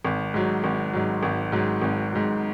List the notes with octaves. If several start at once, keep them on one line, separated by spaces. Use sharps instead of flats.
G#1
G#2 F#3
G#1
G#2 F#3
G#1
G#2 F#3
G#1
G#2 F#3